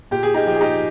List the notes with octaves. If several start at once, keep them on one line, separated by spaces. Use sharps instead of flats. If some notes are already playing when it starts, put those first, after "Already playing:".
A#2 G4
G#4
D#4 G4
F3 G4
G#4
D#4 G4